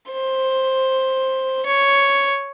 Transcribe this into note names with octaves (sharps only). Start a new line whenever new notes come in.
C5
C#5